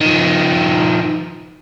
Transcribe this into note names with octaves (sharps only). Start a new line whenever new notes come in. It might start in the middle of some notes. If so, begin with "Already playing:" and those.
D#3 F3